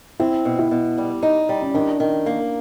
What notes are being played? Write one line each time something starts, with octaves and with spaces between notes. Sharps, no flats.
C4 E4
B2
E4
B2
G3
D#4
G3
C#4
D#3 D4
D#3
A#3